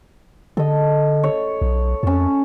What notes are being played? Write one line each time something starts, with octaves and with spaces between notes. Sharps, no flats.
D3 A4 D#5
C#5
B1
F2 C#4 A5